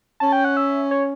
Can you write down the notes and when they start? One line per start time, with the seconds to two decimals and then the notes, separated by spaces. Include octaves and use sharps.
0.20 C#4 A5
0.32 G5
0.44 F#5
0.57 E5
0.91 C#5